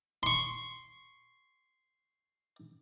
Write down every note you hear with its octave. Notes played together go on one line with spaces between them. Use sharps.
C6 C#6